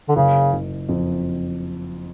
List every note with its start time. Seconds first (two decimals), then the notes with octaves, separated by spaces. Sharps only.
0.09 D3
0.16 F#1 C#3
0.53 F#1
0.89 F2